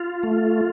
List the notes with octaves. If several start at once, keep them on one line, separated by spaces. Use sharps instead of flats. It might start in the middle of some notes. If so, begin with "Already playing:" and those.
Already playing: F4
A3